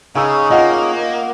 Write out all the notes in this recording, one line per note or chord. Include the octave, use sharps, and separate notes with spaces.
C#3 C#4 D#4 G#4 F5 E6
A#3 F4 D#5 F#5